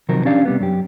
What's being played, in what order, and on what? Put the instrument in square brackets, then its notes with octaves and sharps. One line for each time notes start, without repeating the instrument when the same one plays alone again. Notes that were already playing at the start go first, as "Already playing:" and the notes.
[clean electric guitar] C3 D#3 F3 F#3 A#4
C#4 D4 G4 D5 F5
C3 G3 B3
F#2 G4